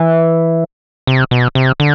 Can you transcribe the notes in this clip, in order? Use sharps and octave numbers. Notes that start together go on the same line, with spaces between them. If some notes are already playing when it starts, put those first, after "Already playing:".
Already playing: E3
C3
B2
C3
D3